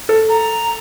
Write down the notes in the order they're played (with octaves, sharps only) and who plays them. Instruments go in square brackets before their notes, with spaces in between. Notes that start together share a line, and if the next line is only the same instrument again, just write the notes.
[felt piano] A4
[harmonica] A#5